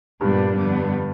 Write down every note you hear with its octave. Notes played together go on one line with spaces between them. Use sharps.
G2 A#2 G3 B3 D4
F2 D3 G3 B3